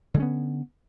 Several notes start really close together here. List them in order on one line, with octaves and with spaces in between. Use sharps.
D3 G#3 C#4 B3